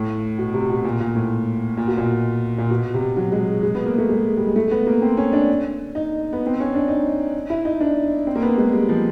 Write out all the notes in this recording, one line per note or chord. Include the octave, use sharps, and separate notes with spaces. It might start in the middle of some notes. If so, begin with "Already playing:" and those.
Already playing: A2
B2
C3
B2
A#2
A#2
A2
A#2
B2
A#2
A#2
B2
C3
F#3
G#3
G#3
B3
A#3
A3
G#3
G3
G#3
A3
B3
A#3
C4
C#4
D4
D#4
B3
C4
C#4
D4
D#4
E4
D#4
D4
C4
A#3
B3
G#3
G3
F3